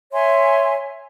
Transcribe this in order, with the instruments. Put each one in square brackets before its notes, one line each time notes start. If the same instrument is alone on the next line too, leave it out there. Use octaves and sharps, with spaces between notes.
[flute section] C#5 E5 G#5 C6